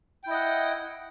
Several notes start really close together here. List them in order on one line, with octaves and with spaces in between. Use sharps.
G5 E4 D#5 F#5